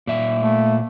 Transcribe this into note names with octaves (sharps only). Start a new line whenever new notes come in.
A#2 E5
A3